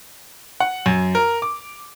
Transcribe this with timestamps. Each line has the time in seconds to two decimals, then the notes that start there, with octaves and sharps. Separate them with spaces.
0.60 F#5
0.86 F#2
1.15 A#4
1.42 D6